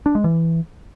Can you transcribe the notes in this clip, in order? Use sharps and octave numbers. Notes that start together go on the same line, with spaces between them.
D4
G#3
E3